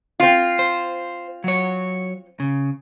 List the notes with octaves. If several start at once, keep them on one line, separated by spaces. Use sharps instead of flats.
C4 F4
C5
F#3 C#5
C#3